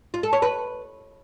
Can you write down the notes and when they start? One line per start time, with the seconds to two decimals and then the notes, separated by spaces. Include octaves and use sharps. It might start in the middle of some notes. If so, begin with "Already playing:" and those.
0.14 F4
0.23 A4
0.33 C#5
0.42 B4